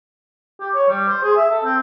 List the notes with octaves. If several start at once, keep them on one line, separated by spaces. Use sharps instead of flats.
G4
C#5
G3
C5
G#4
E5
A4
C4